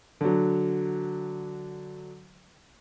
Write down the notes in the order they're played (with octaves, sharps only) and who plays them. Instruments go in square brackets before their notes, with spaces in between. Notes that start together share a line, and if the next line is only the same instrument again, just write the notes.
[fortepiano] D3 F#3